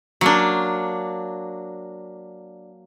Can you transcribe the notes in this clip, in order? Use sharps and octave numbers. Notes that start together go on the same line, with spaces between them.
F#3 A#3 D4